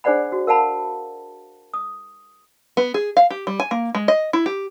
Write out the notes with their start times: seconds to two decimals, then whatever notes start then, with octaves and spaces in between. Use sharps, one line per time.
0.04 D4 G#4 C5 D5 F#5 B5
0.32 F#4
0.47 A#4 F5 F#5 A5 B5
1.74 D#6
2.77 B3
2.94 G#4
3.17 F5
3.30 G4
3.47 G3
3.60 G#5
3.71 A#3
3.95 G#3
4.08 D#5
4.33 E4
4.46 G4